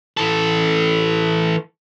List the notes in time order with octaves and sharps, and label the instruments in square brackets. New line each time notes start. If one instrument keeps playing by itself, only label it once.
[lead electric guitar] E3 A4